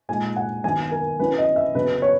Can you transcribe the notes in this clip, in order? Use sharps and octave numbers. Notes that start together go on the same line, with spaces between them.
A#2 G#3 D#4 G#5
F#5
D#3 F#3 B3 D#4 G#5
A#4
F#3 C#4 E4 B4
D#5
E5
C#3 F#3 B3 B4
C#5